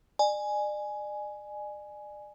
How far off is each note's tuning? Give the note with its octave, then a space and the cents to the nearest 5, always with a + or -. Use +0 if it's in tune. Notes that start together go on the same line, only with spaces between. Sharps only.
D5 +40 G#5 +5